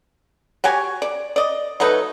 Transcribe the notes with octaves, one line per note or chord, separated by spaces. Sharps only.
F#4 G4 C#5 G#5
D5
D5 D#5
F#3 A3 D#4 B4